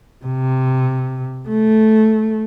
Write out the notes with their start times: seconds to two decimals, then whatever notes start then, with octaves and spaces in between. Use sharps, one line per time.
0.25 C3
1.48 A3